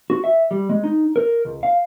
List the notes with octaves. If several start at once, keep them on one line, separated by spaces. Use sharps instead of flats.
F#4
E5
G3
G#3
D#4
A#4
C#2
F5